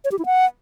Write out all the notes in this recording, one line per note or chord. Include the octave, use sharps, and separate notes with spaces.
C#5
G4
E4
F#5